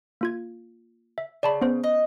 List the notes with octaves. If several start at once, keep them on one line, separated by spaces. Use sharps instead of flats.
A#3 F4 G#6
E5
C#3 D5 A5 B5
B3 C#4 C5
D#5